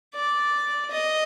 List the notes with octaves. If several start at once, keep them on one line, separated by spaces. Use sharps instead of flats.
D5
D#5